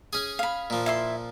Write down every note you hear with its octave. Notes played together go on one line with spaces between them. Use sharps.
C#4 G#4
F5 B5
A#2 F3
E4 E5 C6